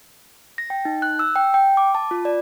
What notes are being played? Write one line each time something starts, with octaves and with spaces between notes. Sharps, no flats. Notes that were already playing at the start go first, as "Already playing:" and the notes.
A#6
G5
D#4
F#6
E6
G5
G5
D6
A5
F4
D5